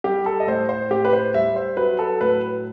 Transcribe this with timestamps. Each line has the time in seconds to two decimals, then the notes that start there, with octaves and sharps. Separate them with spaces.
0.04 G3 G4
0.26 A4
0.40 D#5
0.47 A2 C5
0.69 C5
0.91 A2 G4
1.05 B4
1.13 C5
1.34 G3 E5
1.56 C5
1.77 F#3 B4
1.99 A4
2.21 A2 B4